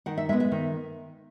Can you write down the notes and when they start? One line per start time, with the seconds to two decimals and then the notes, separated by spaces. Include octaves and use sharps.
0.06 D#3 F#5
0.18 E5
0.29 G#3 E5
0.33 B3
0.40 E5
0.52 D#3